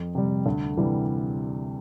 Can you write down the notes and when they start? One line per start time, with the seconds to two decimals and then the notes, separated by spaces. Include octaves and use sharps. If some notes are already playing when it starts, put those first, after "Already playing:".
Already playing: F2
0.15 C3 G3
0.46 D2
0.77 C3 E3 G3